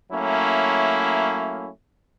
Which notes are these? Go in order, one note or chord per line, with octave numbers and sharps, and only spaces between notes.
F#3 A3 A#3 C#4 E4